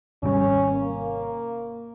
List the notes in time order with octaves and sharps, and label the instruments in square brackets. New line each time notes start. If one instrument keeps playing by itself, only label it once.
[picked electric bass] G#1 C3 G3 [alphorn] C#4
[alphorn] A#3